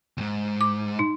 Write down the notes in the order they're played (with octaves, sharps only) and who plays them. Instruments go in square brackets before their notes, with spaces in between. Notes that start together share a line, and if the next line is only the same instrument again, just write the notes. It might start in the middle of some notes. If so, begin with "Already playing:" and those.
[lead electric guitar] E2 G#2
[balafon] D6
D#4